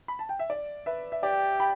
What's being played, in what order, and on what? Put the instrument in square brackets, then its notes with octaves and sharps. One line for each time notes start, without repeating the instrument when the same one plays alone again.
[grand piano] B5
A5
G5
E5
D5
B4 E5
E5
[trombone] G4 [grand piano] D5 G5
[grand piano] G5 B5